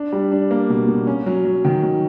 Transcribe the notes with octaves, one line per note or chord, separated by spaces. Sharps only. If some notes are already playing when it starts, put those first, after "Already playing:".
Already playing: D4
G3
D4
A#3
B2
B2
C#4
F#3
F#3
D#3
F#3